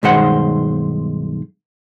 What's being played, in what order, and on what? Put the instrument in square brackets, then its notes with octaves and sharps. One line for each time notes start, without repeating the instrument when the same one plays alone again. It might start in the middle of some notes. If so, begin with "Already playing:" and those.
[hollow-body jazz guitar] B1 G2 D#3 G#3 C5 F#5